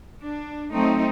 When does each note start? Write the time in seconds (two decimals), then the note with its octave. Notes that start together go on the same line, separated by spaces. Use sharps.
0.22 D4
0.72 F#3 A3 C4 D#4